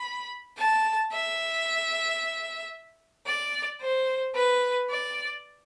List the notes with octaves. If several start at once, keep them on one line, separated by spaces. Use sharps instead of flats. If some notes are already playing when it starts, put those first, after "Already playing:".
Already playing: B5
A5
E5
D5
C5
B4
D5